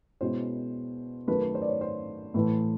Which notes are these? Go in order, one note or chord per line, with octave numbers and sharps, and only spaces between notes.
B2 G#3 C#4 E4 C5
F#2 D#3 F#3 A3 B4
B4
C5
D5
C#5
C5
A2 E3 A3